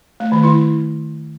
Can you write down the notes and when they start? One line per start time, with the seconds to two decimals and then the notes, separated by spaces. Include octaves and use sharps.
0.20 A3
0.32 D#3
0.43 E4